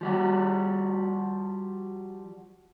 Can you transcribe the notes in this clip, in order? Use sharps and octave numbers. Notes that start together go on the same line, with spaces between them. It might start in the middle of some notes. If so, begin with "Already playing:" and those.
F3 G3 F#4